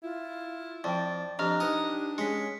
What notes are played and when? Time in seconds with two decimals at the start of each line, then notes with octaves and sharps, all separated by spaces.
0.03 E4 F4
0.84 F2 D5 G5 A5
1.39 F2 D4 G4 D#5 A#5 F6
1.60 D#4 B4 D#5 D#6
2.18 G#3 C#4 B6 C#7